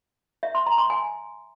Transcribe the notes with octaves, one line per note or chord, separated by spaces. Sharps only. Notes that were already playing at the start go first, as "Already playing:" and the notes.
E5
C6
A#5
C6
G#5